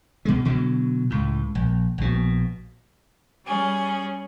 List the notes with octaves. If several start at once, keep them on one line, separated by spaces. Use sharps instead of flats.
B2 G#3
B2 D3 F3 F#3
C#2 A2
A#1
A#1 B2
G3 C#4 G#4